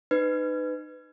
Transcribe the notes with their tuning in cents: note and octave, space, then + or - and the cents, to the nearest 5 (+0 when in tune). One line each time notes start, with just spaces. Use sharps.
D#4 -30 B4 +20